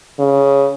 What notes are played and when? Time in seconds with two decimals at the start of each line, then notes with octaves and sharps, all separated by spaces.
0.19 C#3